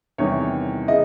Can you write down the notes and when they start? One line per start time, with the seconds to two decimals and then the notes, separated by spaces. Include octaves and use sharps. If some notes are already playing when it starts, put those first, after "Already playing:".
0.18 E2 C3 D#3 G3 C#5
0.88 C#3 E3 D#5